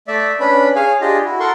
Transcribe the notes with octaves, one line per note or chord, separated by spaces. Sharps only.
A3 D5 E5
C#4 D4 B4 B5
G#4 C#5 F5 G#5
D4 F4 G4 G#4 D#5
E4 F#4
A4 A#4 F#5 C6 C#6